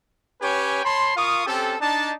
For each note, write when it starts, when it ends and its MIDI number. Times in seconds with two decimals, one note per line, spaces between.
0.41 0.81 61
0.41 0.81 67
0.41 0.81 71
0.41 0.81 73
0.41 0.81 79
0.41 0.81 80
0.84 1.15 73
0.84 1.15 81
0.84 1.15 83
0.84 1.15 84
1.15 1.43 65
1.15 1.43 70
1.15 1.43 77
1.15 1.43 85
1.15 1.43 87
1.46 1.75 60
1.46 1.75 61
1.46 1.75 67
1.46 1.75 69
1.80 2.12 62
1.80 2.12 63
1.80 2.12 81